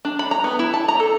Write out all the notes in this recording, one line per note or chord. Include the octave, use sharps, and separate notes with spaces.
D4
B5
A#5
B3
E4
A5
A#5
A4